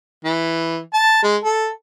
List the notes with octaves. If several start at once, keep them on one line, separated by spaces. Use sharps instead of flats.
E3
A5
G#3
A4